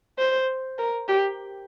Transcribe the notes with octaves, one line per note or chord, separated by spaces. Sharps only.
C5
A#4
G4